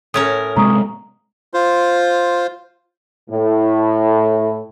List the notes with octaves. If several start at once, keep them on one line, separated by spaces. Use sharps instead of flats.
A2 C#4 A#4 D#6
C3 G#3 B3 A#5 C#6 D#6
F4 C5
A2